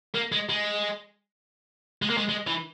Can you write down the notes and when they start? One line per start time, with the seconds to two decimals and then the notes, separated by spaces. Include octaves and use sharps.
0.14 A#3
0.32 G#3
0.49 G#3
2.02 G#3
2.10 A#3
2.17 G#3
2.29 G#3
2.47 E3